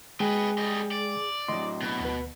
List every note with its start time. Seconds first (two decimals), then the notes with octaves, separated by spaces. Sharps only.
0.20 G#3 G#4 B4 D#5 G5
0.58 G3 D#5
0.91 D5
1.48 A2 F#3 D#5 C6
1.81 B2
2.00 D2 B4